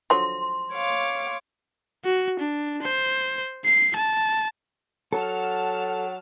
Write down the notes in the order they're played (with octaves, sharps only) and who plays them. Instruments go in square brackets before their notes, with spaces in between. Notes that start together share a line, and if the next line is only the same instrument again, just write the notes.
[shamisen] D3 F3 F#3 [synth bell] C6
[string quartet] C#5 F5 D6
[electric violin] F#4
D4
C5
C7
A5
[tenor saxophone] F#3 [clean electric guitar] A4 [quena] F#5 [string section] A5 F6